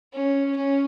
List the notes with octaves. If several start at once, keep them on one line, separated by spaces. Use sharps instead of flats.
C#4
C#4